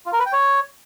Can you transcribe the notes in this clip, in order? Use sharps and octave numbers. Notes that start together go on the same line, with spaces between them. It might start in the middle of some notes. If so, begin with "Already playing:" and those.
F4
A#4
B4
G5
C#5